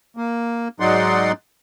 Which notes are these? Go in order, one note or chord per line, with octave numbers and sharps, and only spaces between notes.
A#3
G#2 F#3 D#4 D5 F#5 C6